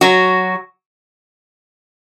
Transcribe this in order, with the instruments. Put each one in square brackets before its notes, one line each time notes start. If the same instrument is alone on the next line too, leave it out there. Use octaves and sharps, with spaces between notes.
[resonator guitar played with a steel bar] F#3 F#4